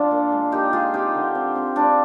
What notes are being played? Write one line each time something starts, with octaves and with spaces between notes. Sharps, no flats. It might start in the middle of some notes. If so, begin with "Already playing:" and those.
Already playing: F3 D4 F4
A#2
G#3
A#2 D#4 G4
G#3 F4 G#4
C4 D#4 G4
D3
C4
C4
G#3 D4 F4